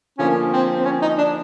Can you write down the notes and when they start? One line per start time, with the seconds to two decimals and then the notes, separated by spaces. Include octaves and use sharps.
0.18 D3 F3 A#3 C#4
0.53 C4
0.75 C4
0.85 C#4
1.02 D#4
1.18 D4